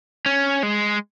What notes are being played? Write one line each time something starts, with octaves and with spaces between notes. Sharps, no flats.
C#4
G#3